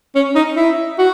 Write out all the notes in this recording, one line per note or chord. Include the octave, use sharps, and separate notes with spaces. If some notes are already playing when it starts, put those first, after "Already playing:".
C#4
D#4
E4
F#4